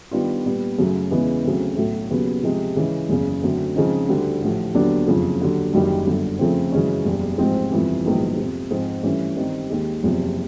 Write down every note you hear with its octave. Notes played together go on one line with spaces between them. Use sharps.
D#3 G3 B3 D4 F4
A#2 G3 B3
F#2 C#3 F#3 A3
E2 C#3 E3 G#3 B3
D2 C#3 F#3 A3 C4
B1 A2 F#3 A3
D#2 C#3 F#3 B3
C3 F3 G#3
C#3 E3 G#3 C#4
F#1 E2 C#3
F#2 D3 F#3 A3 C4
C#3 F3 G#3 C4 D#4
D2 D3 G3
A1 A2 F3
D#2 D3 F#3 B3 D4
F#1 F2 C#3 F3
D#2 D3 F#3
F#1 F#2 D#3 G3
G1 F#2 D3
F2 C#3 F3 A3 C4
F#2 C#3 E3 G#3 C#4
F#1 E2 B2 G3
A1 G#2 F3 G#3 C4
G1 F2 C3 E3
A#1 G#2 D#3 F#3 B3
F2 C3 F3
G#2 F3 G#3 C4
G2 E3 A3 C#4
G2 D#3 G3 C4 D#4
D#2 D#3 G#3
F#1 E2 C3 F3